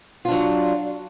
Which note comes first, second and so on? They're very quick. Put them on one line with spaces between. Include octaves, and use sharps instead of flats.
F4 D4 F#3